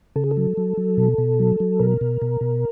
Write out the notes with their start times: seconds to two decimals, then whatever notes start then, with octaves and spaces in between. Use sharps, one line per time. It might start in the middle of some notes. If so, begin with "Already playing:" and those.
0.16 C#3 A4
0.24 G#4
0.31 A4
0.37 F#3
0.57 F#3
0.77 F#3
0.97 B2
1.18 B2
1.40 F#3
1.60 F#3
1.79 B2 A#4
2.01 B2
2.22 B2
2.41 B2